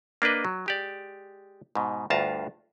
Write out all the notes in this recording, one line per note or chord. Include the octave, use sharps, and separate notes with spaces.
A#3 D4 A#4 B4 D#5
F#3
G#3 G4 D5
G#2 B2
D2 G2 F4 A5 A#5